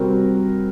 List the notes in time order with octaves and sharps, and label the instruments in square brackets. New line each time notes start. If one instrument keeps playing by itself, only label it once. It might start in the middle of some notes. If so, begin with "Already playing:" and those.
Already playing: [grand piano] C3 G3 C4 F#4 A#4